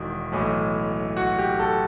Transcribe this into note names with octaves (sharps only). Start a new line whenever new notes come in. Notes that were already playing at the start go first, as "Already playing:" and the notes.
Already playing: E1 E2 D#3
B1 A2 E3
F#4
G4
A4